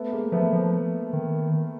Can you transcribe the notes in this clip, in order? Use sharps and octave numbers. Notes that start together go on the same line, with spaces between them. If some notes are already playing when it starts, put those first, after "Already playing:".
Already playing: A3 B3
G#3 A#3
F3 A3 B3
F3
D#3